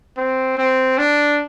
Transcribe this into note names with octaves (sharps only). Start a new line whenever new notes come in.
C4
C4
D4